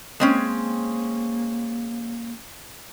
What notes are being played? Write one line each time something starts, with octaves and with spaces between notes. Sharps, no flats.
G#3 A#3 C4 C#4